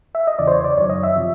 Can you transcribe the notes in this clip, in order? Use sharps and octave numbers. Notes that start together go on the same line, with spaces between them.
E5
D#5
E2 C#3 E3 D5
C5
C#5
D5
F#2 D#3 F#3 C#5
D#5
E5
C3 F3